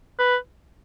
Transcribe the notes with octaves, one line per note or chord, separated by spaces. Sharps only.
B4